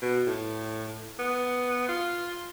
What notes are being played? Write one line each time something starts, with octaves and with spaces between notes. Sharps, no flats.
B2
A2
B3
F4